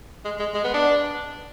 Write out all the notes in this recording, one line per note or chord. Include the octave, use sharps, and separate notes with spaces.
G#3
G#3
G#3
B3
D4